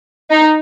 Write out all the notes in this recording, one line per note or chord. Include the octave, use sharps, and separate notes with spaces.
D#4